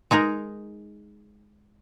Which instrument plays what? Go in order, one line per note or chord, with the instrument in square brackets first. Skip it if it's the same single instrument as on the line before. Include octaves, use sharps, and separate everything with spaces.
[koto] G#3 D#4 G#4 A#4